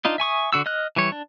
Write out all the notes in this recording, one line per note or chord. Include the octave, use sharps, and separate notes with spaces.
D4 D#4 F4 D#5
E5 G#5 C#6 D#6
D3 F#4 E6
D#5 F6 F#6
E3 G3 C#5
D4